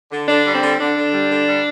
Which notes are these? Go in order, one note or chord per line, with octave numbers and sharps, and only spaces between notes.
D3
D3 D4
G3
C4
D3
D3 D4
D3
G3
D3
G3